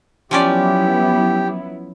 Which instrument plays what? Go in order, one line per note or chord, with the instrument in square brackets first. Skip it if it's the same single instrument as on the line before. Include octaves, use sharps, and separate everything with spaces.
[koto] F3 C#4 D5 [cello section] F#3 B3 E4 [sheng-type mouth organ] G4